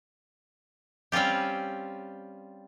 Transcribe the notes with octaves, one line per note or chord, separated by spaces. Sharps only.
G3 C4 C#4 F4 G4